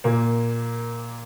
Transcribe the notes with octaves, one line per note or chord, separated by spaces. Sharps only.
A#2 A#3